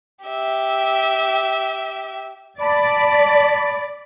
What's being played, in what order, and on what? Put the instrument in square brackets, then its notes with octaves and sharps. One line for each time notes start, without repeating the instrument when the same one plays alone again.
[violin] G4 E5
[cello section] D5 [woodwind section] A5 B5